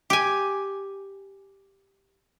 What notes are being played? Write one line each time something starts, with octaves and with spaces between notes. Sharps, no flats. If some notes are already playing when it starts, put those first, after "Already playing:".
G4 G#5